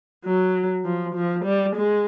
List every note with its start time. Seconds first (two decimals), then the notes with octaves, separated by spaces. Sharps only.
0.25 F#3
0.85 F3
1.15 F3
1.44 G3
1.76 G#3